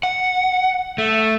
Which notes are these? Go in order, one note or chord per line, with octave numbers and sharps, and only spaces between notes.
F#5
A3